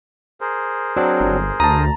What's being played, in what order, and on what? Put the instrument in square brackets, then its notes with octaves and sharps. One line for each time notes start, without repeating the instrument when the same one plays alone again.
[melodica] G#4 A#4 C5
[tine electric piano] F#3 C4 D4
[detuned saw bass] G1
[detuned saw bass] D2 [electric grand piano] A5 A#5 [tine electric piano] D#6